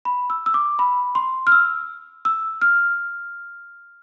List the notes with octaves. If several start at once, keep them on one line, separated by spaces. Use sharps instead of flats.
B5
E6
E6
D6
B5
C6
F6
E6
E6
F6